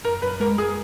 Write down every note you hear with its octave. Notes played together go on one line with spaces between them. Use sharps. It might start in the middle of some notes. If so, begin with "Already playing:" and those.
F#2 A#4
F#2 B4
G#3 A#4
G#3 G#4